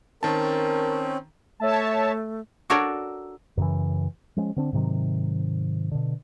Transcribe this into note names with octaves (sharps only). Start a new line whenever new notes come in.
D#3 C4 C#4 A#4 A5
A3 C#5 E5 A5
D4 F#4 A4 A#4 C#5 D5
F#2 C#3 E3
F3 G#3 C#4
D3 C4 D4
G#2 C3 D#3 F#3
B2 D3